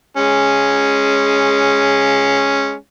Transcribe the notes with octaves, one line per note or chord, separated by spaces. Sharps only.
G#3 C#4